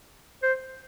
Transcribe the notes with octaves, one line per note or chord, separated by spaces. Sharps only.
C5